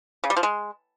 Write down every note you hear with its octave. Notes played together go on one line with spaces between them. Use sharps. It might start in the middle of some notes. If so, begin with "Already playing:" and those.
C#3
G3
F3
G#3